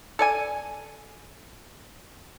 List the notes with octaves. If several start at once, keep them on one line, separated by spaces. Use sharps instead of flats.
A4 D5 G#5